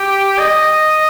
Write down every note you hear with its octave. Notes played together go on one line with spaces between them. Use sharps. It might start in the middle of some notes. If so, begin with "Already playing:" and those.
Already playing: G4
D#5